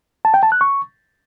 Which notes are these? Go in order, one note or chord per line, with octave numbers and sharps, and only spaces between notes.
A5
G5
A5
F#6
C#6